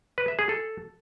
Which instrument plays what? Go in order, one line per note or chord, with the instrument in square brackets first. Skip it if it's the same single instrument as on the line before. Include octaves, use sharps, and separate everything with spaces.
[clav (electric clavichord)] B4
E5
G#4
A4